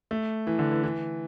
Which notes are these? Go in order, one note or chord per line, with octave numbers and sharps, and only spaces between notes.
A3
E3
D3
E3
E3